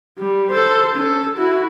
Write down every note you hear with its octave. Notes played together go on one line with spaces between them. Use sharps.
G3
A4 C5
C#4 A4
E4 F#4